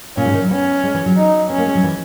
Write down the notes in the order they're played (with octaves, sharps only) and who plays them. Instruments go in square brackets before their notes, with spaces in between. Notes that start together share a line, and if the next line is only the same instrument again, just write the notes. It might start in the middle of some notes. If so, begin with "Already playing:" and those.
[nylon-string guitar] A#2 [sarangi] C#4
[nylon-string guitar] G#2
D#3
F#3
[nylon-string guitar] B3 [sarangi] C#4
[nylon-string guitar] G#3
E3
F#3
[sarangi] D#4
[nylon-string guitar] B3 [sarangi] C#4
[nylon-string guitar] A#3
G#3
F#3
E3